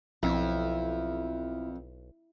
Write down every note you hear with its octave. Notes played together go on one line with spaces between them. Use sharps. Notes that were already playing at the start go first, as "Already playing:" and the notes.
B1 F2 E4